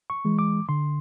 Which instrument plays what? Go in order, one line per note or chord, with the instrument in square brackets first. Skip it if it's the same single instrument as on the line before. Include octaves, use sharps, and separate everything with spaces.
[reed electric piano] C#6
E3 G#3
D6
D3 C6